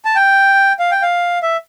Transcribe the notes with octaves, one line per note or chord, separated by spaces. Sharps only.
A5
G5
F5
G5
F5
E5